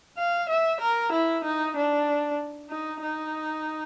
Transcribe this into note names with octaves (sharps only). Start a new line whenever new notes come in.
F5
E5
A#4
E4
D#4
D4
D#4
D#4